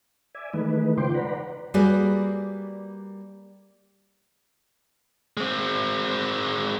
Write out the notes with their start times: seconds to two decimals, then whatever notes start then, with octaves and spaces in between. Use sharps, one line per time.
0.35 D5 E5 G#5
0.53 D#3 E3 G#3 A3 D#4 B4
0.98 C#3 F4 C5 G5 C6 D6
1.14 B4 D5 F#5 A#5 B5
1.74 G3 A#3 F#4 G#4 B4 D5
5.37 G#3 C4